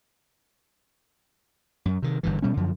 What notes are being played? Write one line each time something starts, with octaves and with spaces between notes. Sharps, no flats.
F#2
C3 D#3
G1 G2 E3
B2 G3 C#4
F#2 D3 F3